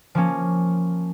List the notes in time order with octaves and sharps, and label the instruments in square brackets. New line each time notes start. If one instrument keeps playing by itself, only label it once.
[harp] F3 A#3 C#4